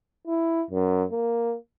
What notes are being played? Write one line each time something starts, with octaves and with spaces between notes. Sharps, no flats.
E4
F#2
A#3